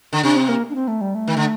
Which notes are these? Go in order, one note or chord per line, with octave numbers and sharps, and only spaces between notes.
D3
C3 D4
C4
A#3
D4
C4
A3
G3
A3
D#3
D3